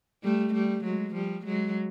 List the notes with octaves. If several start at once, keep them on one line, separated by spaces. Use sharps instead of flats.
G3 A3
G3 A3
F#3 G#3
F3 G3
F#3 G#3